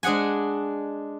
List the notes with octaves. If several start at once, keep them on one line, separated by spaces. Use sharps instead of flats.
G#3 D4 G#4 F#5 G#5